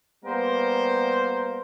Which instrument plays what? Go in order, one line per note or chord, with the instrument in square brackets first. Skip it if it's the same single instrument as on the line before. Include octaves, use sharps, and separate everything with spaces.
[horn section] G3 A#3 B3 A#4 C5